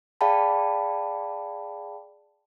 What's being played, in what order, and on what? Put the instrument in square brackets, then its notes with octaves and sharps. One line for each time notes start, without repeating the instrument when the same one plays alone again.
[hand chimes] G#4 D5 F5 G5 A5 B5